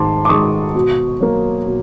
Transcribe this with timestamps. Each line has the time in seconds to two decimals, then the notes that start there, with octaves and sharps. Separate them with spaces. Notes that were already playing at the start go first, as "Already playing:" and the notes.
Already playing: G#2 D#3 G#3 A5 C6 D6
0.25 D6
0.29 D#3 G#3 C#6 D#6
0.75 B2
1.20 F#3 A#3
1.67 B2